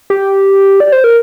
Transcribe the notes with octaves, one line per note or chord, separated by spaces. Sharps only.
G4
D5
C5
A#4